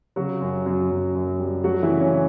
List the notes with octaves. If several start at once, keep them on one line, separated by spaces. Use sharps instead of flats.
C#3 F#3 F#4
F#2
F#2
F#2
F#2
G3
F#3 A3 F#4
E3 E4
C#3
C#4